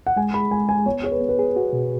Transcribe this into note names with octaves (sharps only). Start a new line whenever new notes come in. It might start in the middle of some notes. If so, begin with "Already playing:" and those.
F#5
G#3 G#5
G#4 B5
G#3 G#5
G#3 G#5
B3 C#5
G#4 C#5
B4
B3
B4
G#4
F#4
B2